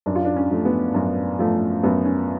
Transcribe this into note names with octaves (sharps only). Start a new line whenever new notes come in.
F#2 D4
F4
D4
C#4
F3 A3
B3
F#2 C#4
F3 A3
F#2 B3
C#4